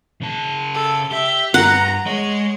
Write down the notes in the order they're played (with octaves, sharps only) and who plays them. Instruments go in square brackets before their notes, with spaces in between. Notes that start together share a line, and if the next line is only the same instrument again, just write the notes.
[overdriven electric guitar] C#3 A5
[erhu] A4
[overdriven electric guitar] G4 [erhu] E5
[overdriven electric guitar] G2 [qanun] F#5 [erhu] A#5
[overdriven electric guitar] G#3 D#5 [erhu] C#5